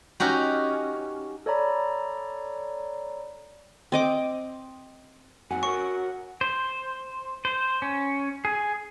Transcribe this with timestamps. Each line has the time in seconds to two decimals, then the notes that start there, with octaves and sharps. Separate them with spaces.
0.20 C#4 D#4 F#4 G4
1.46 A4 C#5 D5 A#5 B5
3.92 C4 D#5 D6
5.51 D#2 C3 F#3 F#5 G#5
5.63 F#4 A#4 C#5 C#6
6.41 C5
7.45 C5
7.82 C#4
8.45 G#4